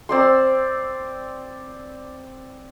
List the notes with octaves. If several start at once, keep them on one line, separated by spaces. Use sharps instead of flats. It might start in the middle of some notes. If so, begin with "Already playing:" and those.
C4 D5 C6